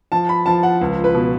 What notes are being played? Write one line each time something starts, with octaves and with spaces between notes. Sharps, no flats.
F3 A5
B5
F3 A5
F#5
C#2
B4
B2